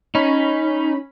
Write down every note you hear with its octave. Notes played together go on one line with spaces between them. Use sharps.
C#4 D#4 B5